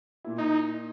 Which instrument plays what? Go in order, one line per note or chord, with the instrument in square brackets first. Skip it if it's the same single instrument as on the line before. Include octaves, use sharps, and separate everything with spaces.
[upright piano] A#2 A#3 E4
[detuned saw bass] D#4